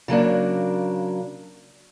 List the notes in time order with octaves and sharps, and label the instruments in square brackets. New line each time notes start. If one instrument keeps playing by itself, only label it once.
[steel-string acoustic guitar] C#3 F#3 A#3 D4